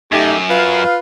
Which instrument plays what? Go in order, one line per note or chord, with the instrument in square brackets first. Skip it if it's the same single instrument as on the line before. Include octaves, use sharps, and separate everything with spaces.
[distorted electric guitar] F#2 [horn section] A3 D#4 G4
[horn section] F4 B4 F5